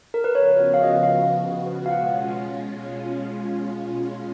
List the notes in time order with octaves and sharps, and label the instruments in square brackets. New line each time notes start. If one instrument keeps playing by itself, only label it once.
[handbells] A#4
B4
[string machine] C#3 F3 B3 F#4 [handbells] C#5
[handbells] F5
D#5
D#5
F5
F5
[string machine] B2 G#3 C#4 F4 [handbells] F#5